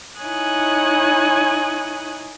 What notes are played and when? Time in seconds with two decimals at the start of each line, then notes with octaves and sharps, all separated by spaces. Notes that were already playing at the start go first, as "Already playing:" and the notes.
0.20 D#4 E4 C#5 G#5 D#6 F#6